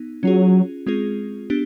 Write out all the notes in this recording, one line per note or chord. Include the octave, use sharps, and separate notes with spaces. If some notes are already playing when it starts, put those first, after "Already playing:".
Already playing: B3 D#4
F#3 C#4 F4 G#4
G#3 C4 F4 G#4
B3 D4 G4